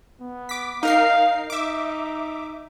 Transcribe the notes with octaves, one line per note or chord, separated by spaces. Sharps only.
B3
D6 B6
D#4 A#4 F5 C7
D#4 E5 D6